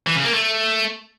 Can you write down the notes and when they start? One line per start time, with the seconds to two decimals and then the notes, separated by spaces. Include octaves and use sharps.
0.07 E3
0.16 C#3
0.25 A#3
0.33 A3